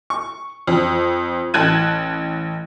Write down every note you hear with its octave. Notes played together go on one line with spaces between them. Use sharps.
C#6
F2
A1 A5 F#6 G#6 D#7